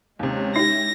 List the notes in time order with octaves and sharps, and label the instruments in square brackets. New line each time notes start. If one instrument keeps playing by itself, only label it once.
[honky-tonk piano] D#2 C3 [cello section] G#3 C#4
[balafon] D#4 [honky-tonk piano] E4 G4 [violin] A#6